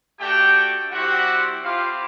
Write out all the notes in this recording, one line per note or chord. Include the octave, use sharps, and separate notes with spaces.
A3 D4 F#4 G4 G5
G3 C4 E4 F#4 G4 F#5
C4 E4 F4 G4 F5